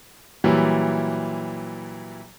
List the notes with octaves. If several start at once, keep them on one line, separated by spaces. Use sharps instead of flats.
A#2 E3 F#3 G3 E4